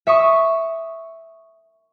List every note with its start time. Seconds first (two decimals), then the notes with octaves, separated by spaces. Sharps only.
0.07 E5 C#6 D#6